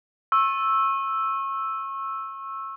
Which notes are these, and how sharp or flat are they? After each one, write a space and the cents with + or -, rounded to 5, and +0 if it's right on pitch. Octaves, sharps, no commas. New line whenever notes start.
C#6 -30 E6 +0